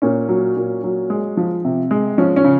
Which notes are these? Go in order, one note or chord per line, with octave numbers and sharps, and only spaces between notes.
A#2 C#4
F#3
A#2
F#3
G#3
F3
C3
G#3
F3 C#4
C#4
C#3